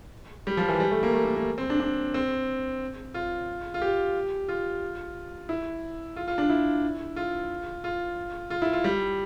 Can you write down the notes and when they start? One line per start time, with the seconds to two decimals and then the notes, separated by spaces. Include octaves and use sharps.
0.47 G3
0.57 F3
0.69 E3
0.80 G3
0.91 A3
1.03 A#3
1.14 A3
1.25 A#3
1.36 A#3
1.58 C4
1.70 D4
1.80 D4
2.14 C4
3.14 F4
3.74 F4
3.82 G4
4.49 F4
5.49 E4
6.16 F4
6.28 F4
6.38 D4
6.50 E4
7.16 F4
7.84 F4
8.50 F4
8.62 E4
8.73 F4
8.84 G3